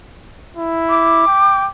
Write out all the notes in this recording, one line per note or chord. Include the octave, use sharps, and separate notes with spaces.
E4
D6
G5